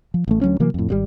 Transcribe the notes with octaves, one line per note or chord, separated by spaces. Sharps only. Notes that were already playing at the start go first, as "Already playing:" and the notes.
F3
A1 A3
D2 F#3 A#3 C#4
C3 E3 F#3 A#3
F2 A2
G#1 C#3 G3